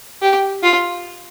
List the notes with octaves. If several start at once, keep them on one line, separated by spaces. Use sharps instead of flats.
G4
F4